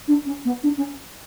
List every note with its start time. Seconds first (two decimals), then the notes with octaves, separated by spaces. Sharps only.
0.08 D4
0.26 C#4
0.45 B3
0.63 D4
0.77 C#4